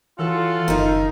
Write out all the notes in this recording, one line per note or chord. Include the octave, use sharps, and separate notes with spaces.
E3 C#4 F4 F#4 A4
F#1 D#3 D#4